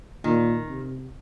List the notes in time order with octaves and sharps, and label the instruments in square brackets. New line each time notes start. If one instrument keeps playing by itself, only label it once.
[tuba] A#2 [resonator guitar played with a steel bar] D#3
[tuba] C3